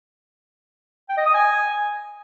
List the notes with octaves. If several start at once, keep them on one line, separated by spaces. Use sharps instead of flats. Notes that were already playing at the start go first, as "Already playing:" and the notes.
G5
D#5
D#6
G#5